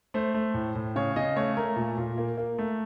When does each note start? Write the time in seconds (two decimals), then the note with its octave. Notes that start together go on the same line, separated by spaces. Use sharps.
0.14 A3 C5
0.34 A3
0.54 A2
0.75 A2
0.96 C#3 C#5
1.16 C#3 D#5
1.36 A3 C#5
1.57 A3 A#4
1.76 A#2
1.98 A#2
2.18 A#3
2.37 A#3
2.58 A3